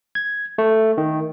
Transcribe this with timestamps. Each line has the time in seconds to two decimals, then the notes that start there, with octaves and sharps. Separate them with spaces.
0.15 G#6
0.58 A3
0.98 D#3